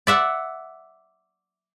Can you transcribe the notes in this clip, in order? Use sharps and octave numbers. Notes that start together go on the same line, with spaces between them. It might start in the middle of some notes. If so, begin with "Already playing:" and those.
D5 E5 F#5